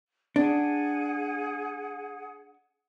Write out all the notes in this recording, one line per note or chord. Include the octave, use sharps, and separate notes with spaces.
D4 G#4 F#5